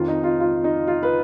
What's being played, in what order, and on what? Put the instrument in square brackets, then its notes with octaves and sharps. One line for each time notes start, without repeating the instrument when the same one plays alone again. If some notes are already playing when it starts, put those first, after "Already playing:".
Already playing: [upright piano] F2 D#3 F4
D#4
F4
F4
D#4
F4
B4